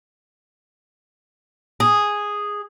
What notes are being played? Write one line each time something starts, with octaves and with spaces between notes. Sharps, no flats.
G#4